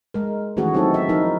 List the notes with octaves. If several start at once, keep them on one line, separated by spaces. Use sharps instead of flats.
G#3 A#4
D#3 E3 A3 C#4 F#4 G#4
F#3 C4 D#4 F#4 A4
E5
F3 D#4 E4 A#4